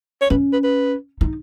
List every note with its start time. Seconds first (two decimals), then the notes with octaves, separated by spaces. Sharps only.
0.22 C#5
0.30 C#4 B4
0.53 B4
0.64 B4
1.21 D#4